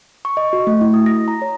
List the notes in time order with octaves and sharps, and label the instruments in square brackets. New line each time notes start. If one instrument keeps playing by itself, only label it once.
[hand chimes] C#6
D#5
F#4
A3
E4
D#6
A#6
A#5
C#5